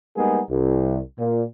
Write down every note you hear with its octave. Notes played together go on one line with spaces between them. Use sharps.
G3 G#3 A#3 B3 D#4 G#4
C2
A#2